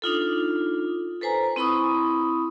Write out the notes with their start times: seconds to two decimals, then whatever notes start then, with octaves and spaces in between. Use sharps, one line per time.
0.02 D4 D#4 F4 A4
1.21 A4 B4 C5 G#5 A#5
1.56 C4 E4 B5 C#6 D#6